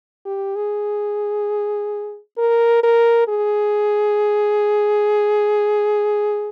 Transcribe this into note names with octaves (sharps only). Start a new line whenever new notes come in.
G4
G#4
A#4
A#4
G#4